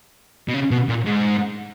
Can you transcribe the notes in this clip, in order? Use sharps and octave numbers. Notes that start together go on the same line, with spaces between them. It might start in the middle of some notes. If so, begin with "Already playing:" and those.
B2
C#3
B2
A#2
G#2